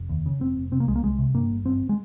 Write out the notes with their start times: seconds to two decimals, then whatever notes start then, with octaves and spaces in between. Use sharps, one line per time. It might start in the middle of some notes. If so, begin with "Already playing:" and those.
Already playing: F1
0.09 D#2
0.26 C#3
0.40 F1 C4
0.57 F1
0.72 C3 C4
0.80 A#3
0.87 C2 G#3
0.96 A#3
1.03 C2 G#3
1.19 C3
1.34 G2 A#3
1.50 G1
1.65 G1 C4
1.89 G#3